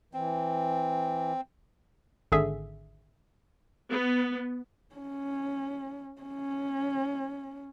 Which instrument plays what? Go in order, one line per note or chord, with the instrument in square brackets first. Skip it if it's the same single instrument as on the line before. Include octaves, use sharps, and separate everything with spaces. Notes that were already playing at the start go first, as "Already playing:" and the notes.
[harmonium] E3 [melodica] C4
[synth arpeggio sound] G#1 D3 G#4 E5
[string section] B3
[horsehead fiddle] C#4
C#4